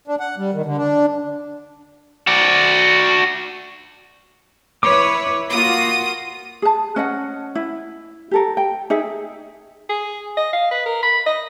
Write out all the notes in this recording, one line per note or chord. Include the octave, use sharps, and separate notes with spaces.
D4
F#5
G3
D#3
D3
D4
F#4 D5
E4 B4 C#5 D6
A#3 F4 F#4 D#6 D#7
G#4 A5
C#4 D#5 F#5
E4
G4 A4 A#4
G5
D#4 G#4 E5
G#4
D#5
F5
B4
A#4
B5
D#5